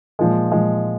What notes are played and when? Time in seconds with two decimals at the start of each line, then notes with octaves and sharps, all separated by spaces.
0.19 A#2 F3 G#3
0.52 A#2 F3 G#3